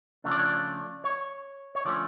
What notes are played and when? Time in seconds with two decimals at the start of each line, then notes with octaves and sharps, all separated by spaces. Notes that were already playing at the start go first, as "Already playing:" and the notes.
0.24 C#3 F3 A3 D4
0.32 D5
0.39 C#5
0.46 D5
1.04 C#5
1.75 C#5
1.85 D3 F3 A3 C#4 D5